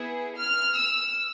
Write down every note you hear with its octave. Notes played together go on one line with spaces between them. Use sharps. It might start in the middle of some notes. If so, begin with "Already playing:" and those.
Already playing: B3 E4 G#4
F6
E6